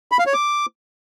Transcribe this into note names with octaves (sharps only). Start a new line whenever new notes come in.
B5
F5
C#5
D6